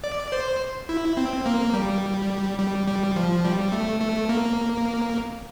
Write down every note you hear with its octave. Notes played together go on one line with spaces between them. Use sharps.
D5
C5
E4
C4
A#3
G3
G3
G3
F3
G3
A3
A3
A#3